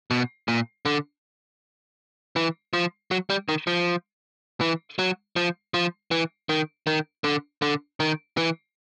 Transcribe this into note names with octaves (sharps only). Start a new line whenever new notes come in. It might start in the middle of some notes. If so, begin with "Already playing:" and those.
B2
A#2
D3
E3
F3
F#3
G3
D#3
F3
E3
F#3
F3
F3
E3
D#3
D#3
D3
D3
D#3
E3